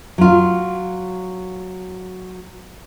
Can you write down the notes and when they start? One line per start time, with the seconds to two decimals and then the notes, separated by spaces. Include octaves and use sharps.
0.18 F#3 F4